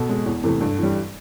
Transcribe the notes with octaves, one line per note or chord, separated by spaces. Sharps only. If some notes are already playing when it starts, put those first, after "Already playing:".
Already playing: B2 A4
G#3
E2
C3 E3 A3
G2 A4
E3 G3